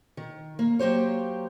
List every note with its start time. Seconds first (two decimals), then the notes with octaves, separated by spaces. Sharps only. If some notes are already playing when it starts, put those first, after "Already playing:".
0.17 D#3
0.59 A#3
0.79 F#3 A#3 G4 C5 C#5